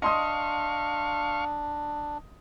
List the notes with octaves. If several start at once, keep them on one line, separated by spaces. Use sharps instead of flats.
D4 D#5 F5 C6 C#6 D#6